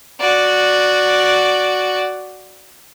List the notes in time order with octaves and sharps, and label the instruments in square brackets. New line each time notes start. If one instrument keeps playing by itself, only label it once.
[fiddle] F#4 D5